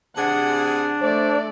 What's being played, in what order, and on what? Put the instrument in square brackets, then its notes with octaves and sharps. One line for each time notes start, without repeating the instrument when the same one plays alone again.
[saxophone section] C3 G#4 [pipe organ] D4 [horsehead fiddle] F#5
[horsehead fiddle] A3 D5 [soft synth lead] C5